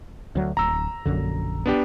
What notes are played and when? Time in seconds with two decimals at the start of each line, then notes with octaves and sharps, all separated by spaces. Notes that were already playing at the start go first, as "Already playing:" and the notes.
0.35 D2 F#3
0.57 D1 A#5 E6
1.05 A#1 F#2 D3
1.66 B3 D4 G4